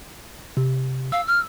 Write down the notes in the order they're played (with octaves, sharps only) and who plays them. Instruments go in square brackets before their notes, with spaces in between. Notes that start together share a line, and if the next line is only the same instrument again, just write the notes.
[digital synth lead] C3
[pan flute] F5 [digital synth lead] E6
[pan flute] F6